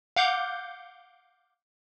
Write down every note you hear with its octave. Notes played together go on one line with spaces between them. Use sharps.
F5 F#5 D6 G6